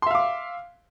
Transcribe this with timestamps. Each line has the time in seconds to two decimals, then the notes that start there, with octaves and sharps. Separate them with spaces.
0.02 C6
0.06 E5
0.11 F5
0.15 D6